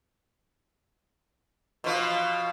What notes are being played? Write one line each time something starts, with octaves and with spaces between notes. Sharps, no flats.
B2 F3